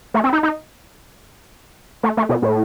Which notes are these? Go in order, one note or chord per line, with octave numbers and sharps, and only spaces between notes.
A3
C4
D#4
D#4
A3
A3
B2
A2